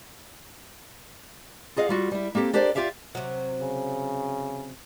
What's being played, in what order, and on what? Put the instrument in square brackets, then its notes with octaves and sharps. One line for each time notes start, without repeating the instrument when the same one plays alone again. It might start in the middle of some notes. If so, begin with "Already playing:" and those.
[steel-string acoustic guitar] F4 G#4 D#5 F5 F#5
G3 F4 F#4
G3 E4
A#3 C4 G4 A4
D4 G4 A4 A#4 C5 D5
F4 G4 D5 E5 F5
[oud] C3 F#3
[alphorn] C#3